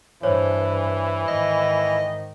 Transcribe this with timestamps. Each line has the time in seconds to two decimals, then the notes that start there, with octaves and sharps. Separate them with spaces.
0.23 G2 E3 C5 C#5
1.28 G#2 D#3 D#5